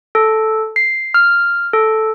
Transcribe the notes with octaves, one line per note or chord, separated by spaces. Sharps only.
A4
C7
F6
A4